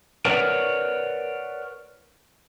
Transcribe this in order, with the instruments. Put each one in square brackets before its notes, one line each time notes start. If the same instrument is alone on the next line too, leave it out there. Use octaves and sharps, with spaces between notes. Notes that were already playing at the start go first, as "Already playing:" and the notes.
[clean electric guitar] A#4 B4 C#5 D5 F#5